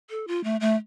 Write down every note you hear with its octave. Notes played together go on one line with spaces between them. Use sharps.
A4
F4
A3
A3